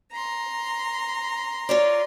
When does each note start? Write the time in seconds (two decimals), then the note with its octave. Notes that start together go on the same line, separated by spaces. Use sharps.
0.12 A#5 C6
1.69 F4 C#5 D5